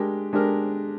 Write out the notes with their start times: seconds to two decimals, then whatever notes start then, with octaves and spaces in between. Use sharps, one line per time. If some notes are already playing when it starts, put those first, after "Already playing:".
Already playing: G#3 D4 G4 A#4
0.33 G#3 D4 G4 A#4